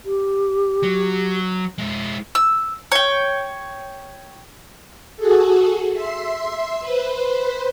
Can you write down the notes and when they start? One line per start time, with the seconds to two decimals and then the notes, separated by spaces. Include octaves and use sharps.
0.05 G4
0.83 F#3
1.78 G#3 E4
2.35 E6
2.92 C#5 G5
5.16 F#4 G#4 A4
5.93 E5 C6
6.80 B4 C5